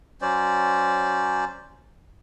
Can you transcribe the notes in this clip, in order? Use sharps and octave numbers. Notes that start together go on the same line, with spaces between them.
F#3 C#4 C5 D5